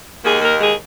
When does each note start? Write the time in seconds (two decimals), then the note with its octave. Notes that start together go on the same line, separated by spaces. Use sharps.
0.24 D#2 D#3 G#3 A#3 G#4
0.42 A#3 A#4
0.60 G#3 G#4